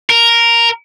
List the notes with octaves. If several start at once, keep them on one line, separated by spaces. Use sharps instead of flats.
A#4